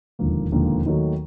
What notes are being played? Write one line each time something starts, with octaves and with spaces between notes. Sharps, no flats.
E1 D#2 D3 F3 A#3
E1 D#2 D3 F3 A#3
D#2 D#3 F#3 A3